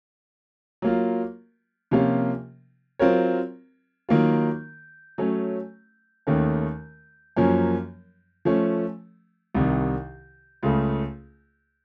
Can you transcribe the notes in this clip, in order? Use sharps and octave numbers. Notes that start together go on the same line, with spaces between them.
F#3 A#3 F4
C3 F3 A#3 C#4 F4
F#3 C4 F4 A#4 C#5
D#3 F#3 A#3 F4
F#3 A3 C#4
D#2 D#3 A3 C#4
F#2 F3 A#3 C#4
F3 A3 C#4
C2 C3 D#3
C#2 C#3 A3